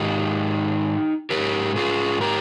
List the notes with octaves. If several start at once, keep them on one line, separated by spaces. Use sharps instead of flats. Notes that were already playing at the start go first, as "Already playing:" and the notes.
Already playing: G#2 D#3 D#4 G4
G#2 D#3 G4 A#4
F4 G#4
G4 A#4